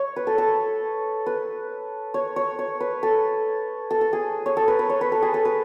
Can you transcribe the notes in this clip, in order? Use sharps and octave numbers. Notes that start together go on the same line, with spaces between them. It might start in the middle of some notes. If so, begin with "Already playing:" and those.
Already playing: C#5
B4
A4
A4
B4
C#5
C#5
C#5
B4
A4
A4
A4
G#4
C#5
A4
B4
B4
C#5
B4
A4
G#4
A4
B4